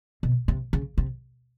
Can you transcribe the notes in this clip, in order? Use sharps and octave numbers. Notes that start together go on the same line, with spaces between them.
B2
C3
C#3
C3